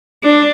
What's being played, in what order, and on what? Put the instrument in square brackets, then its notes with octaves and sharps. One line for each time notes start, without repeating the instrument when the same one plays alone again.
[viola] D4